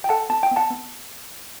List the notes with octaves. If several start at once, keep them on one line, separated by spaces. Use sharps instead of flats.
G5
A4 F#5 A5
B3 A5
G5
B3
F#5 A5
B3